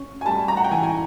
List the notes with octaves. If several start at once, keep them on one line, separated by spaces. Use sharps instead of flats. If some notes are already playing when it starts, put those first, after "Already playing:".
Already playing: C#4
G#5
G3 A5
A#5
F#5
G5
E3 G#5
G#5